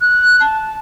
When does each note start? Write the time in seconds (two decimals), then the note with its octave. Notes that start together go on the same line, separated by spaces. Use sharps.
0.01 F#6
0.40 A5